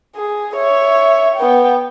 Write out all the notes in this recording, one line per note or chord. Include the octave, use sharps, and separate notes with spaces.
G#4
C#5 E5
B3 G5